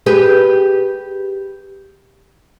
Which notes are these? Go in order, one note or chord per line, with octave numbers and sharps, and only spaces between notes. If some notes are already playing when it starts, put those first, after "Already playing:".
G4 G#4 B4